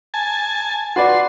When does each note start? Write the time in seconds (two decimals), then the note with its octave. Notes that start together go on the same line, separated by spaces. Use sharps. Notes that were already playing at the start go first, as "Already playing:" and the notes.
0.14 G#5 A5
0.96 F#4 B4 D5 C6